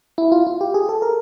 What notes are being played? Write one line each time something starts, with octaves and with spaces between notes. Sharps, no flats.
E4
F4
F4
G4
G#4
A4
A#4